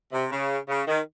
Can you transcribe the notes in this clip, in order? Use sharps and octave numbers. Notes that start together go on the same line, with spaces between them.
C3
C#3
C#3
D#3